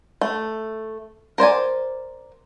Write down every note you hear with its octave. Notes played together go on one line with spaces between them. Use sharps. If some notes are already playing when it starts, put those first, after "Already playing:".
A3
A#4 C5 D5 G#5